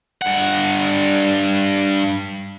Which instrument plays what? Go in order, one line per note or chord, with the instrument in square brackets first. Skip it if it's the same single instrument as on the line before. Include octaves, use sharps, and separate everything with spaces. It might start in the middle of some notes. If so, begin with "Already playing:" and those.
[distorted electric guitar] G2 F#5